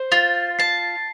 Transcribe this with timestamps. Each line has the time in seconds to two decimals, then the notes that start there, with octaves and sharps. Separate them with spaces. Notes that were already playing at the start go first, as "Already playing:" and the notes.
Already playing: C5
0.12 F4 A6
0.59 A5 C7